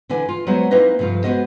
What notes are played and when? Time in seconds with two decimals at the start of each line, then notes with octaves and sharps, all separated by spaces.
0.09 D3 E3 E4 D5 G#5
0.29 F4
0.47 F#3 G#3 B3 F#4 C5
0.71 A#3 C4 D#4 E4 B4 D#5
0.99 G2 C3 F3 A3 F4
1.24 G#3 B3 F#4 C5 D#5